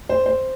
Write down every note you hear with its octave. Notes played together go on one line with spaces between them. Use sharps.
C5
C5